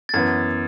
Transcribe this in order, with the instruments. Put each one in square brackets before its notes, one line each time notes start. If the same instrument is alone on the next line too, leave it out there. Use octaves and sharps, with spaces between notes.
[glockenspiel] A6
[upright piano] F#2 E3 B3 [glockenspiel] G#6